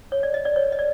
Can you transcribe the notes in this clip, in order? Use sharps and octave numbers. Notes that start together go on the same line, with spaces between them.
C#5
D5
D#5
D5
C#5
D#5
D5